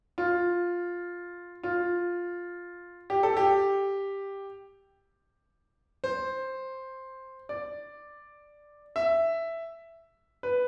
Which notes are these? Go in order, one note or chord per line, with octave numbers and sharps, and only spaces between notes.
F4
F4
G4
A4
G4
C5
D5
E5
B4